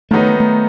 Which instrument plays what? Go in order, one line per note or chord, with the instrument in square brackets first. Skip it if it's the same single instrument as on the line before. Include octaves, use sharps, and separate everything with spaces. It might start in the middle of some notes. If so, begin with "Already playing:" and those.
[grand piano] D#3 F#3 B3 D#4 [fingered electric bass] A3
[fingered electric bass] A3